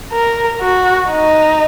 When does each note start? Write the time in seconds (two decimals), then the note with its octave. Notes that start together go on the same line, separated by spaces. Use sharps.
0.12 A#4
0.61 F#4
1.10 D#4